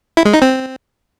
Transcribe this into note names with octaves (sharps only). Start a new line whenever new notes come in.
E4
G#3
D#4
C4